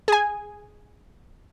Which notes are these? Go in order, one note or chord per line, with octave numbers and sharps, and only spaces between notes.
G#4 G#5